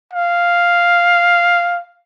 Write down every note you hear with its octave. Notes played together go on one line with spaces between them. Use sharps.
F5